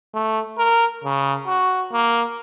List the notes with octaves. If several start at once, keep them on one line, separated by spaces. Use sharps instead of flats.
A3
A#4
C#3
F#4
A#3